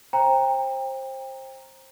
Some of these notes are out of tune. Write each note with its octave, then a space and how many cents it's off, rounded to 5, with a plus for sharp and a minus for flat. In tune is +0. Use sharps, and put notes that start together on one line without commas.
C5 +20 G5 +25 A#5 +0